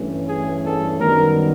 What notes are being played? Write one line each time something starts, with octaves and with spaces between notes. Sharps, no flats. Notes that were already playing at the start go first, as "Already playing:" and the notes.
Already playing: G2 E3 A3 C#4
G#4
A4
F#2 D#3 G3 B3 A#4